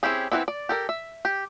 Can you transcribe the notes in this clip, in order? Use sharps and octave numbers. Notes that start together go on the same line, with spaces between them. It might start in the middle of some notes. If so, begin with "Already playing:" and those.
C4 C#4 E4 G4 G#4
E3 F#3 B3 C4 E4
D5
G4 A4 A#4
E5
G4